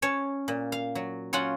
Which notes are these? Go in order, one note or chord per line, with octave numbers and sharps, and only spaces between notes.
C#4 C#5 A5
A#2
F5
F#3
F#3 C#4 F4 F#5